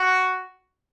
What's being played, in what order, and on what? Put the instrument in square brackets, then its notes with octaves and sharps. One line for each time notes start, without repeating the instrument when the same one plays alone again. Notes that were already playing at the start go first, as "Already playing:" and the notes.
Already playing: [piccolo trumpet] F#4